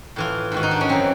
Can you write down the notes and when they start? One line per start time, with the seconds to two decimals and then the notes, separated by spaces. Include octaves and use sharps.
0.16 A2 E3 F4
0.52 G#2 D#3 F#4
0.63 D#4
0.71 D4
0.81 C#4
0.89 F#2 C#3 E3 C4